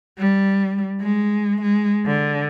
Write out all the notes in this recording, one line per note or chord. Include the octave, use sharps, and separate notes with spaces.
G3
G#3
G#3
D3